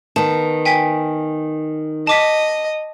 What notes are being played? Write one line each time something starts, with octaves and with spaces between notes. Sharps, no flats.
D#3 B3 A5
G5 G#5 B6
D#5 A5 D6 B6